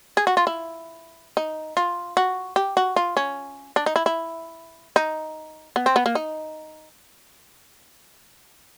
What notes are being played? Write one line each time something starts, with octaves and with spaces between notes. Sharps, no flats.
G#4
F#4
F4
E4
D#4
F4
F#4
G4
F#4
F4
C#4
D4
D#4
E4
E4
D#4
B3
C4
B3
A#3
D#4